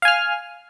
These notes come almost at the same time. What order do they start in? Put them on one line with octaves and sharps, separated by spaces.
F5 G#5 F6